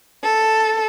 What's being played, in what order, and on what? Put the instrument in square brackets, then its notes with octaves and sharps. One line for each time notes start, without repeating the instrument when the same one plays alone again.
[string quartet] A4